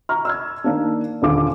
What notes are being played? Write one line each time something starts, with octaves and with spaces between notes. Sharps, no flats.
A#5 C#6 F6
E6 F6 G#6
D#3 A#3 D4
D#1 D3 F4 D6